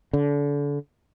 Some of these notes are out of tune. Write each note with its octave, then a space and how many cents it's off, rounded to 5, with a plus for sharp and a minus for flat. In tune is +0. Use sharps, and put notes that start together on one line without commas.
D3 -30